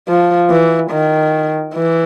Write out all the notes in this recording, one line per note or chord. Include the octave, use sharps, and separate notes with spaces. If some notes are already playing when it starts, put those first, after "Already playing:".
F3
E3
D#3
E3